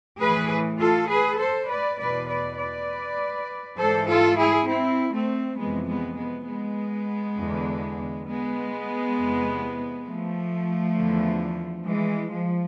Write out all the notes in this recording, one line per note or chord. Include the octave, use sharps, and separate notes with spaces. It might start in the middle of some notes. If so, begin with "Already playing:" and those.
A2 E3 G#4 B4
F4 A4
G#4 B4
A4 C5
B4 D5
E2 B2 B4 D5
B4 D5
B4 D5
G#2 E3 A4 C5
F4 A4
E4 G#4
C4 E4
A3 C4
F2 C3 E3 G#3 B3
G#3 B3
G#3 B3
G#3 B3
E2 D3
G#3 B3
E2 C3 E3
F3 A3
E2 D3
E3 G#3
F3